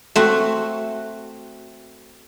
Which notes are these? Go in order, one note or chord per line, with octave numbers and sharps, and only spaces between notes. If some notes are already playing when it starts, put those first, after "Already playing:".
A3 C4 F#4